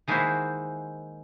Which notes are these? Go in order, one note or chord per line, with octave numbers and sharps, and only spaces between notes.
D#3 G#3 A#3 E4 F#4 C5